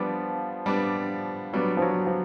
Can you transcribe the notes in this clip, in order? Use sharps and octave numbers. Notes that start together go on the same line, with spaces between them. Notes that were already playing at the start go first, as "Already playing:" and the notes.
Already playing: F3 G3 B3 D4
G3 B3 D4
F#3 G3 B3 D4
F3
F#3
F3